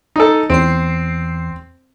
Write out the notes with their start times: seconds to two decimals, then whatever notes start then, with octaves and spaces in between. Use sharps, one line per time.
0.16 D#4 A4
0.50 E2 C4 C7